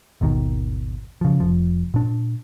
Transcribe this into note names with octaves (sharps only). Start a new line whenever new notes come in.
G#1 D#2 B2 D#3
C#3 F3
F1 F3
A#2 D4